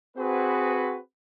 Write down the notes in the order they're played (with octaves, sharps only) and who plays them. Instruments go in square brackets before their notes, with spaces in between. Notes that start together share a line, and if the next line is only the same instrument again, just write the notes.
[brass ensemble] C4 F#4 G#4 B4